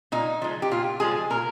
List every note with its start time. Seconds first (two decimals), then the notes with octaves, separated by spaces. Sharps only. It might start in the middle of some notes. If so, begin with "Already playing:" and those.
0.12 A#2 D#4
0.42 F3 G#3
0.62 G4
0.71 A#2 F4
1.00 F3 G#3 G#4
1.30 A#2 A#4